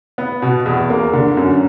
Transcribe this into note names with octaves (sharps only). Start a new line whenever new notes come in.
B3
B2
E2
A#3
D3
F#2